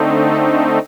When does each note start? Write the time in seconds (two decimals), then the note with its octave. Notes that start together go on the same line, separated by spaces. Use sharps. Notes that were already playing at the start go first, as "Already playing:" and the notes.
Already playing: D3 A3 C4 D#4
0.22 A4